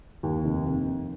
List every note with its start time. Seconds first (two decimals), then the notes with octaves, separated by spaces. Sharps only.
0.23 D#2
0.44 F1
0.66 F1
0.87 F1